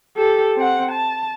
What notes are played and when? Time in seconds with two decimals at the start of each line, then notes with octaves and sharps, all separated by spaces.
0.17 G4 A4
0.57 C4 F#5
0.92 A5